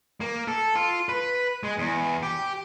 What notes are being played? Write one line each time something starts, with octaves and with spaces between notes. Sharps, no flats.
A#3
A4
F4
B4
G#3
E2
G4